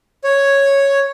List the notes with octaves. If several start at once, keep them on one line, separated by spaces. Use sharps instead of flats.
C#5